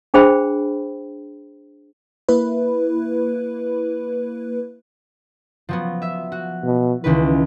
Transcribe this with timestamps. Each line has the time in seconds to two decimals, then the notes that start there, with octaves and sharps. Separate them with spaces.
0.14 D4 G#4 C5 G5 B5
2.29 A#3 E4 B4
5.69 F3 F#3 B3
6.02 E5
6.32 F#4
6.64 B2
7.04 C#2 D#3 E3 B4